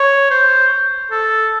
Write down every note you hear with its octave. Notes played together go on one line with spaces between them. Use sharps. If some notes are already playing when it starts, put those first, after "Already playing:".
Already playing: C#5
C5
A4